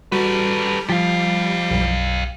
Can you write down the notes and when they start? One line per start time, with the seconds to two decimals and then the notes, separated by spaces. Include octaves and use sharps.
0.12 G3 F#4 A4 B4
0.89 F3 G4 F5 A6
1.71 B1 F#2